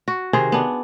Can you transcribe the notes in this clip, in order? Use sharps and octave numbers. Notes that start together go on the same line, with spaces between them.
F#4
C3 D#3 G#4 C5
B3 D4